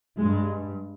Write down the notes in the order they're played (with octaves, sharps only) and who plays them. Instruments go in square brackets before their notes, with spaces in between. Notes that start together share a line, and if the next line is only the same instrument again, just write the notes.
[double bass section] G2 G#3